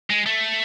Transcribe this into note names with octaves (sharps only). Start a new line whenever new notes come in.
G#3
A3